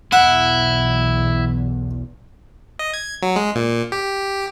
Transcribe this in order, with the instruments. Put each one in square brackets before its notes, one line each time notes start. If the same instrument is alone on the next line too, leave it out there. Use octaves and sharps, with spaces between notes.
[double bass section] B1 E2 [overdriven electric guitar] E4 [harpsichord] F#5
[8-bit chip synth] D#5
G#6
F#3
G#3
A#2
G4